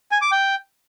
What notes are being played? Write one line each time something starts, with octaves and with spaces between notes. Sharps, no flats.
G#5
D6
G5